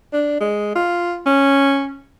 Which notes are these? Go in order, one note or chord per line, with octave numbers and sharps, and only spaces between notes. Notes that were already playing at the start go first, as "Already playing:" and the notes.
D4
G#3
F4
C#4